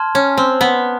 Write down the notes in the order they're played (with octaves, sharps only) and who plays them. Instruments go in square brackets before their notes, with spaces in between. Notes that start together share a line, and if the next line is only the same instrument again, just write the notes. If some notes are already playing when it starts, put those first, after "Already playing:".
Already playing: [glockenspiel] A5 C6 F6 G#6
[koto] C#4
C4
B3